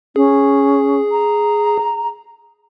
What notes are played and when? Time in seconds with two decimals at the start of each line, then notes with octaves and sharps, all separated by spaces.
0.16 C#4 G#4
1.12 A#5